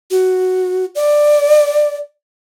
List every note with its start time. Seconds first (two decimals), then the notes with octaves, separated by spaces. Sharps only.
0.11 F#4
0.95 D5